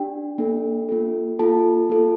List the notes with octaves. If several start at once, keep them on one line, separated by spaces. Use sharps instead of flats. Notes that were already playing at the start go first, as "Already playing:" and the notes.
Already playing: D4 G4 G5
A#3 D4 A4
A#3 F4 A4
A#3 F4 A4 A5
A#3 F4 A4